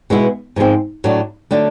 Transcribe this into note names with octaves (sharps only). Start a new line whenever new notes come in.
B2 G#3 B3 E4
G#2 F3 G#3 C4
A2 F#3 A3 D4 F#4
D3 F#3 A3 D4